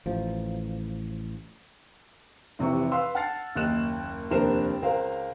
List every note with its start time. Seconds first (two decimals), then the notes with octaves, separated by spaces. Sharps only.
0.06 A1 F3
2.59 F1 C3 E3 C#6
2.92 B4 F5 C6 E6
3.15 F#5 A5 F6 A6 C7
3.56 F#1 D#2 D#5 F#6 E7
4.31 F1 D#2 D4 A#4 C5 E7
4.82 C#2 A#4 C5 F5